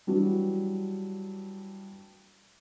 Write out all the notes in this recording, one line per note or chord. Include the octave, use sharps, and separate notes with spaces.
E3 F#3 G3 D4